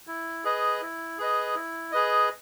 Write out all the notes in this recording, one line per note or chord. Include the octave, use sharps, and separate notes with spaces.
E4
G#4 B4 D#5
E4
G#4 B4 D#5
E4
G#4 B4 D#5